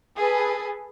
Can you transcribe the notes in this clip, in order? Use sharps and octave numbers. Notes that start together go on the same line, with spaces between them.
G#4 A4 B4